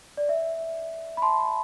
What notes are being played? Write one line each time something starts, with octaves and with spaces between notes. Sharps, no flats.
D5
E5
B5
A5 C6